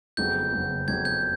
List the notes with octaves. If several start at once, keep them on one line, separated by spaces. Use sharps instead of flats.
F#1 F2 C#3 F#3 B3 G6
F#1 F2 C#3 F#3 B3
F#1 F2 C#3 F#3 B3 G#6
G6